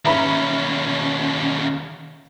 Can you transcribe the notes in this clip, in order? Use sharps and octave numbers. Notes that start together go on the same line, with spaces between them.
D#2 C#4 E5 A#5 B5